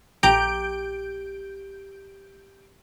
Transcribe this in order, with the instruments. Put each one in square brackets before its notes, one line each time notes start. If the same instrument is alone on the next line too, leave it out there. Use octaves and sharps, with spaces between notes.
[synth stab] A#1 G6 D7 [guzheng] G4 A#5